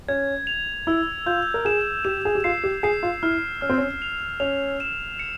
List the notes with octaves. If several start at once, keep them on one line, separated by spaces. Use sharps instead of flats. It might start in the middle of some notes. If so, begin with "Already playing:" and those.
C#4 G#6
F7
E4 E6
F4 G6
A#4
G#4 E7
G4 E7
G#4
G4
F4 C7
G4
G#4 C7
F4
E4 F6
C#4 F6
C4
C#4
F7
C#4 F7
E7
C#7